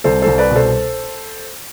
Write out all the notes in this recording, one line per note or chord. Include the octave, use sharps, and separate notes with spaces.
C2 A4 C5
C2 A4 C5
B4 D5
B2
A4 C5